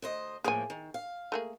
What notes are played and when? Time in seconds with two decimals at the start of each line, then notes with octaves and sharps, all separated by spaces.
0.02 D2 C5 D#5
0.44 A2 F3 A#3 G#4 G#5
0.70 D#3
0.94 F5
1.32 A3 A#3 G#4